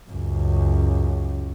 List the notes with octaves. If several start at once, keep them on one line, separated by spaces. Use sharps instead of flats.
C#2 F#2